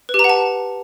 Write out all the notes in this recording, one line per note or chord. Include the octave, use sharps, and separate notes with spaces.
B4
G4
A#5
F#5
A5